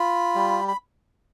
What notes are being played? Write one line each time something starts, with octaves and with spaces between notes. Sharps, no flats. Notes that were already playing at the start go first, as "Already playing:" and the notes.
Already playing: F4 B5
G3
B5